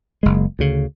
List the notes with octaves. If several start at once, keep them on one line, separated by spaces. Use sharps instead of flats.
F#1 G#3
D2 C#3